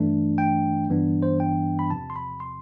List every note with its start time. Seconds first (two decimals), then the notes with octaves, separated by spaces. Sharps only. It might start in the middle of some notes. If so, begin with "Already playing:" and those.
Already playing: G2 E3 A3 D4
0.38 G5
0.88 G1 G2 E3 B3 D4
1.22 C5
1.40 G5
1.79 B5
1.90 E2 C3 F3 A5
2.10 C6
2.16 B5
2.40 C6